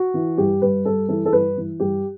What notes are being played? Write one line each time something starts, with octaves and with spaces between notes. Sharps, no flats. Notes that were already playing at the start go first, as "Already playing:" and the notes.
Already playing: F#4
E3
G2 G4
G2 B4
G2 A4
E3 A4
A4
G2 B4
E3
G2 G4